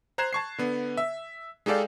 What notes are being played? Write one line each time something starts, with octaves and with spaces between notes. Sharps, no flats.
C5 A#5 F#6 G#6 C7 E7
A5 C#6 C7
D3 B3
E5
G#3 D#4 G4 A4 D5 F5